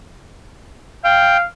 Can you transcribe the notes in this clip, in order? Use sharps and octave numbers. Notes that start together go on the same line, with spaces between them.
F5 G5